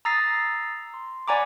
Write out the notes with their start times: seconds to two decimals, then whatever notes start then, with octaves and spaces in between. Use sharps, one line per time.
0.05 A#5 D#6 E6 A6 A#6 C7
0.94 C6
1.28 D5 F#5 G#5 A#5 B5 D6